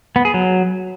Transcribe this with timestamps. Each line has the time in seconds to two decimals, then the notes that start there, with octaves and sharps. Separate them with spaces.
0.16 B3
0.25 G#4
0.34 F#3